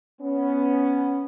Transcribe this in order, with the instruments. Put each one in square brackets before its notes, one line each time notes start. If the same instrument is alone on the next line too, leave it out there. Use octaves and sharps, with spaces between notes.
[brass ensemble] B3 C#4